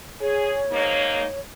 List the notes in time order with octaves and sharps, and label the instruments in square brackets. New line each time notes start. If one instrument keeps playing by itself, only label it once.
[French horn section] G#4 [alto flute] C#5
[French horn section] G#2 A#3 D#4